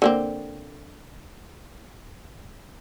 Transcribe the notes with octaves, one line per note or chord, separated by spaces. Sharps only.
D3 A#3 C4